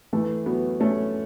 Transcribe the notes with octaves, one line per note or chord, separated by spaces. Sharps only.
E3 A3
F#3 B3
A3 C#4